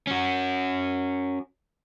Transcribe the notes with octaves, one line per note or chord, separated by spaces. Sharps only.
C#4 F#4